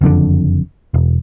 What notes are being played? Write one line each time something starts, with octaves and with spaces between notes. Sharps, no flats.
F#1 F2 G#2 D3
E1